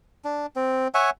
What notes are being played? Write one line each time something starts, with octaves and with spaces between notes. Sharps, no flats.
D4
C4
C#5 E5 F#5 G#5